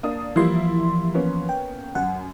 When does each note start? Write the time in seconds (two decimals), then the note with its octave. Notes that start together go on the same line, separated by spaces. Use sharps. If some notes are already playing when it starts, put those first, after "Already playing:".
0.03 A#3 D4 D#6
0.36 E3 F3 G3 A#3 E4 C6
1.14 A#3 B3 C#4
1.49 G5
1.95 F#2 F#5